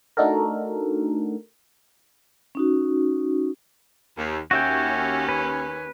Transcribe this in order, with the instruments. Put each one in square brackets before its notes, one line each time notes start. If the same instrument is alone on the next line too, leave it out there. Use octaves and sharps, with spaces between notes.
[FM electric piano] A3 D4 D#4 F#4 A4 A#4
[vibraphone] C#4 D#4 F#4
[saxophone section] D#2
[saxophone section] D#2 C#4 [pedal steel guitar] F#4 E5 G5
[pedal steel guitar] B4